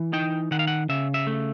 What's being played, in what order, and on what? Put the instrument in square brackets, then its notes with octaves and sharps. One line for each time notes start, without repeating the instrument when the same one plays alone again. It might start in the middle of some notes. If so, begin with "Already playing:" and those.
Already playing: [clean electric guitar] E3
D#4 G5
D#3 F#5
F5
F#5
C#3 E5
E5
A3